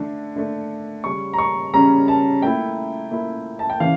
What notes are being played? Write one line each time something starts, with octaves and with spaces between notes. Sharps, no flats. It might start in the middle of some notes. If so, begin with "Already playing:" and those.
Already playing: D3 A3 D4
D3 A3 D4
C#3 G3 C#4 C#6
A#5
C#6
C#3 G3 C#4 A#5
A5
A#2 A3 E4 G5
A#2 A3 E4
A5
G5
C#3 E3 F5